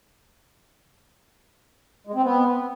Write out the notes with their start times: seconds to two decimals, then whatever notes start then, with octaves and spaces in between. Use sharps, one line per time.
2.07 G#3
2.15 C4
2.23 B3